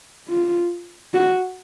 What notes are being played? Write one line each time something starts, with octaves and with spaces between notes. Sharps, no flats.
F4
F#4